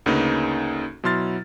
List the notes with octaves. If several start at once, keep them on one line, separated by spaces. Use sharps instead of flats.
D2 C#3 A#3 D#4 B4
B2 F#3 E4 C6 F6 A6